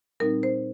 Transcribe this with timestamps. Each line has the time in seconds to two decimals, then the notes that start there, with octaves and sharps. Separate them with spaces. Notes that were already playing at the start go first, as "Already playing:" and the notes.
0.20 A#2 G3 C4 D#4 A#4
0.43 C5